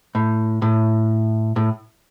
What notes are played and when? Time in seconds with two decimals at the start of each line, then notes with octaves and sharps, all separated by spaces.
0.15 A2
0.62 A2
1.56 A2